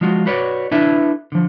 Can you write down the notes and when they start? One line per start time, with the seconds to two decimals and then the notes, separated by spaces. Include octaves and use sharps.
0.01 F3 G#3 F4 F#4
0.26 F#4 B4 C#5 D5
0.71 D4 E4 A4 B4 E5
1.32 D3 F3